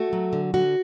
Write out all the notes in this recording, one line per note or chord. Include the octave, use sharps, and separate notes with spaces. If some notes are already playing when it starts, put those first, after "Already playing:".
Already playing: A3 F#4
F#3
D3
D3 F#4